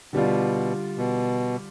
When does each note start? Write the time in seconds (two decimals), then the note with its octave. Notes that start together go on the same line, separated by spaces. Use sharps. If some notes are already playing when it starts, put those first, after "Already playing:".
0.13 B2 D3 G3 D4 F4
0.98 B2